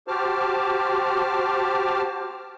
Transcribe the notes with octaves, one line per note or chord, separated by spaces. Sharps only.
F#4 G4 C5 A5 D6 F6